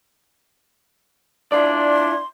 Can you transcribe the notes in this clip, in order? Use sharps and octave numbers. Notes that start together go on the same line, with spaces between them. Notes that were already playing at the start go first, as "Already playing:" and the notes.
D4 E4 F4 D5 C6